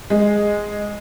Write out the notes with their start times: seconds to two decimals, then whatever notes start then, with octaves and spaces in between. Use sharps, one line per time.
0.10 G#3